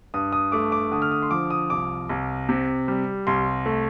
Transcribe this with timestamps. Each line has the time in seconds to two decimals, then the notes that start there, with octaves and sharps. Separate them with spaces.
0.14 G2 D#6
0.32 D#6
0.52 A3 D6
0.72 D6
0.92 D3 D#6
1.02 F6
1.12 D#6
1.22 C6
1.31 F3 D6
1.50 D#6
1.70 C2 D6
2.09 C2
2.49 C3
2.88 G3
3.27 C2 C6
3.66 A3